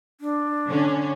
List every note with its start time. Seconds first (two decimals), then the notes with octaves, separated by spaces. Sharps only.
0.21 D4
0.68 D3 C#4